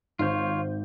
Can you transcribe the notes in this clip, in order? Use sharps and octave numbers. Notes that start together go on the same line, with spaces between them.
G#1 F4 C5 C#5 G6